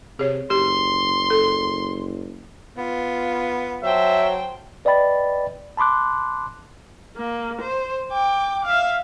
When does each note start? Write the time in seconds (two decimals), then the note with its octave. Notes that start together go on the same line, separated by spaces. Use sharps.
0.19 C3 G#4 C#5
0.50 F#1 G4 C6
1.30 A4
2.77 B3 F4
3.83 F#3 C5 E5 G5 A5
4.85 B4 D5 D#5 G5 B5 A6
5.77 A5 B5 C6 D6 F#6
7.17 A#3
7.62 C5
8.11 G5 D6
8.65 E5 F5